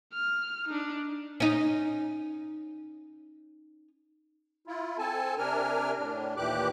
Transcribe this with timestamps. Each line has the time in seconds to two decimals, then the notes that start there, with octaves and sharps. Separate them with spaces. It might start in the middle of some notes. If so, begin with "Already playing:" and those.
0.13 F6
0.68 D4 D#4
1.40 C#4 D#4
4.67 E4 F4
4.98 C4 A4 G#5 A5
5.38 C3 D4 A#4 G#5 F6
5.97 A2 D4
6.37 D#2 A#2 E3 G4 D6 F#6